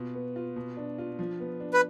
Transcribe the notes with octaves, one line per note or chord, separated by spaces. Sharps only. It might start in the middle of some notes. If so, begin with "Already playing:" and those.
Already playing: B2 F4
B3
F4
B2
D4
F4
F3
B3
D4
B4